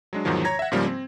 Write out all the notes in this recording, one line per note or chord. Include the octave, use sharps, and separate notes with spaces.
F#3 G#3 D4
E2 G#2 D#3 F3 F#3
C#5 A#5 G#6 A#6
E5 F#5
G#2 C#3 F3 G3 A#3
C4